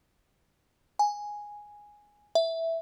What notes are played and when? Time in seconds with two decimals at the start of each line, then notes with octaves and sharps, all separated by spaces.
0.99 G#5
2.35 E5